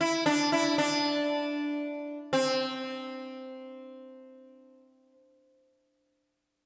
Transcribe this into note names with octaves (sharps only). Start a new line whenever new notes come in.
E4
D4
E4
D4
C4